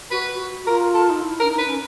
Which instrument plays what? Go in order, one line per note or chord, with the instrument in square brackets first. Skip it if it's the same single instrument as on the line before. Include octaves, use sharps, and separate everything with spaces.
[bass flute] F#4 [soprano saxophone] B4
[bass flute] F#4
[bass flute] F4 [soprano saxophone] A#4
[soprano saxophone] A4
[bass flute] D#4
E4
[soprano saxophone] A#4
[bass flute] D4
D#4
[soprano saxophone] B4
[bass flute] C#4